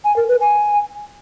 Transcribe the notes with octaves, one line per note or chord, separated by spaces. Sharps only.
G#5
A#4
B4
G#5